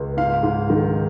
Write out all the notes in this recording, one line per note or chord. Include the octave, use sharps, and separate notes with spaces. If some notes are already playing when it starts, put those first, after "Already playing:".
Already playing: C#2
G#2 F5
G#2
D#3